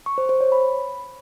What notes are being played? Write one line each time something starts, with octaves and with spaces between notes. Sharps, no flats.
C#6
C5
C5
C#5
B5